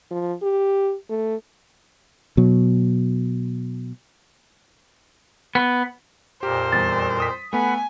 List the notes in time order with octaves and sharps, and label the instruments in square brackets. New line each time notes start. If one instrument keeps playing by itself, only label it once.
[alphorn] F3
G4
A3
[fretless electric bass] B2 F#3
[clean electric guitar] B3
[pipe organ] F2 A#2 A#4 [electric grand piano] G4 [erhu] C5
[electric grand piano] E2 G3 [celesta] A6
[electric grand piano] D#6 B6
[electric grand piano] A3 B3 [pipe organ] F#5 B5 [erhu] G#5